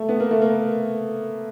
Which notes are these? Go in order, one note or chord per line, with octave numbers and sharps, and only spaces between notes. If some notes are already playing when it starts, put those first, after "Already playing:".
Already playing: A3
B3
A#3
A3
A#3